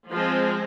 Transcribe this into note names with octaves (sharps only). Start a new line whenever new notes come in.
F3 G#3 C4